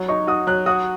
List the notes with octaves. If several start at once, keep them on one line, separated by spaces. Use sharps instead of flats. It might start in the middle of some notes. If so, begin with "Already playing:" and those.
Already playing: F#3
D#4 C#6
F#4 D#6
F#3 F#6
F#4 D#6